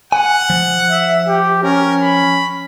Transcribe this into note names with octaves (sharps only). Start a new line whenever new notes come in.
F#5 G#5
F3
E5
G4
C#4 A#4
B5